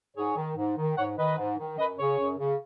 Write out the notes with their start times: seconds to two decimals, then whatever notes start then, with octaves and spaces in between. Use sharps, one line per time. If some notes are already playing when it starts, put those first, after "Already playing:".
0.16 G#2 G#4 C#5
0.37 D#3
0.57 G#2
0.77 D#3
0.97 G#2 C#5 F#5
1.17 D#3 B4 D#5
1.37 G#2
1.58 D#3
1.78 F#2 B4 D#5
1.98 C#3 G#4 C#5
2.18 F#2
2.38 C#3